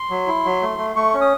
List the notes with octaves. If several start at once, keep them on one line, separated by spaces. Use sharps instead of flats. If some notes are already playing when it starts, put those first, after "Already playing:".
Already playing: C6
F#3
E4
F#3
A3
A3
A3 C#6
C#4
D#6